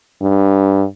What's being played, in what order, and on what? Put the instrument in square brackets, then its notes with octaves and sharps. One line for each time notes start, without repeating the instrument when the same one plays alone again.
[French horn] G2